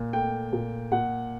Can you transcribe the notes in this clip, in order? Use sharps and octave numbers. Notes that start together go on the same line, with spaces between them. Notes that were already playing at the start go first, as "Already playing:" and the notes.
Already playing: A#2
A3 G5
A#2
A#2 F#5